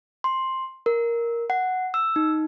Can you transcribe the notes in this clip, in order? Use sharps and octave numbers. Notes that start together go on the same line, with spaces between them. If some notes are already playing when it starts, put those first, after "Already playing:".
C6
A#4
F#5
E6
D#4